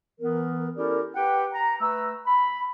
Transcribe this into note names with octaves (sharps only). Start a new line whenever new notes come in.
E3 B3 A#4
C#4 E4 G4 A4 A#4 D5
G4 B4 F#5 G5
A#5
A3 B4 A#5 E6
B5